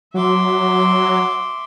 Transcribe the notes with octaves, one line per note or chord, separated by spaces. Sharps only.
F#3 E5 C6 D6